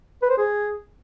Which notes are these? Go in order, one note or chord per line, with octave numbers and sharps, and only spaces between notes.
B4
C5
G#4